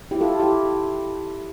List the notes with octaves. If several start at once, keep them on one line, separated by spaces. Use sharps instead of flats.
E4 G4
F4 A4
E4 G4